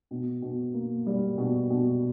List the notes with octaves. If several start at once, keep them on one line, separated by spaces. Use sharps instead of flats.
B2
B2
A#3
G3
B2
B2